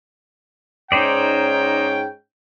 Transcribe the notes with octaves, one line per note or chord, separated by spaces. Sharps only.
G#2 C#4 D#4 C5 D5 G5